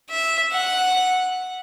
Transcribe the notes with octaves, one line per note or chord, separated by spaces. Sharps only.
E5
F#5